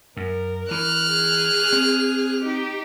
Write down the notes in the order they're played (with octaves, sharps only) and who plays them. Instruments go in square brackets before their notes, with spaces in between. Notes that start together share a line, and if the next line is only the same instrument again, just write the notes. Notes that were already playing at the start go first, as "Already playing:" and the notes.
[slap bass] F#2 [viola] A#4
[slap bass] E3 [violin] F6 F#6
[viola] G#4
[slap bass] C4
[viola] D#4 G4